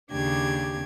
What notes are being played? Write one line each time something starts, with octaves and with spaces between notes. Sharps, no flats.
D#2 C#3 D4 G4 G#6